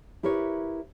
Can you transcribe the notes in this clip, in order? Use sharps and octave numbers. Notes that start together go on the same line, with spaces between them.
E4 G4 A#4 B4 C#5